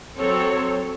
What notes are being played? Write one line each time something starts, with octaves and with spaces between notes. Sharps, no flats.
F#3 C4 A4 C#5